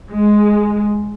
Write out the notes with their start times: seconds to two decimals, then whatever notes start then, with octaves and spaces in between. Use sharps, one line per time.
0.12 G#3